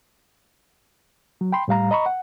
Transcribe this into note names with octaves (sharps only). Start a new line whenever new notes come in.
F#3
G5 B5 C6
A2 G3 F5 A#5
D#5 A#5 B5 C#6
F#5